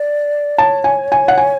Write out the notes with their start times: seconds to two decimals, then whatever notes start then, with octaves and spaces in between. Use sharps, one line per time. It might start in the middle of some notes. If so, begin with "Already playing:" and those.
Already playing: D5
0.58 C#5 A5
0.84 G#5
1.12 G#5
1.28 F#5
1.38 G#5